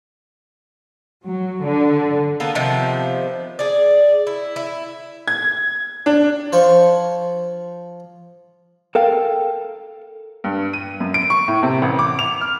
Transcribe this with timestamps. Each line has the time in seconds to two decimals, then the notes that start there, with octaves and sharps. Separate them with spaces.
1.24 F#3
1.66 D3
2.40 A#3 B3 A4
2.55 C3 D#3 F3 B3
3.59 G#4 D5
4.27 E4
4.56 E4
5.28 G#6
6.06 D4
6.52 F3 C5 C#5 C#6
8.95 A4 A#4 F5 G5
10.44 G2
10.73 D#7
11.00 F#2
11.14 D7
11.30 C#6
11.48 A2
11.63 C3
11.82 A1
11.99 D6
12.19 F7
12.41 F6